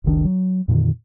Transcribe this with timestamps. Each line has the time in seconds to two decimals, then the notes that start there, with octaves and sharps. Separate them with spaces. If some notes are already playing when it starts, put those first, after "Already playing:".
0.04 F#1 C#2 D#3 D4
0.25 F#3
0.68 F2 A#2 D3 D#3